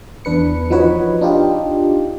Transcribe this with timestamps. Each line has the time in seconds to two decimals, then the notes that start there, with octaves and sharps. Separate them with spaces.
0.25 E2 D4 B4 C#7
0.70 F3 D#4 F#4 B4 C#5
1.21 D4 D#4 F4 G4